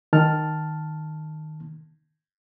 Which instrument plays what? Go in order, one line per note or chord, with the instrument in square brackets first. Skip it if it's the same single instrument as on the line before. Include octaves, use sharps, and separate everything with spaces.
[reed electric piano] D#3 A5 F6